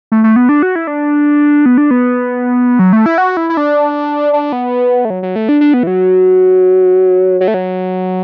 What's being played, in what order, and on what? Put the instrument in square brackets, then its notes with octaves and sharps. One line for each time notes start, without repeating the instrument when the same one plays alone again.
[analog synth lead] A3
A3
B3
D4
F#4
E4
D4
B3
D4
B3
F#3
A3
E4
F#4
E4
E4
D4
D4
B3
A3
F#3
F#3
A3
D4
D4
B3
E3
F#3
F#3
A3
F#3